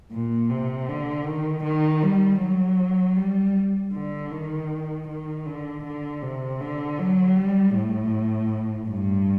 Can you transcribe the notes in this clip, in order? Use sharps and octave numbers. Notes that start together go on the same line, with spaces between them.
A#2
C3
D3
D#3
D#3
G3
F#3
G3
D3
D#3
D#3
D3
D3
C3
D3
F#3
G3
A2
G2